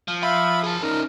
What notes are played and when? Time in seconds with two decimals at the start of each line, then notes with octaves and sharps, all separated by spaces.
0.08 F3
0.23 E5 F5 B5
0.63 G#4 A5
0.82 C#4 D#4 A#4